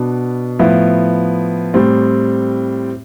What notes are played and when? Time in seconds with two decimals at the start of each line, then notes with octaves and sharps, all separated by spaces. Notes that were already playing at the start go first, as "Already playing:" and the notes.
Already playing: B2 B3 D4
0.59 A2 F3 B3 E4
1.74 A2 G3 C4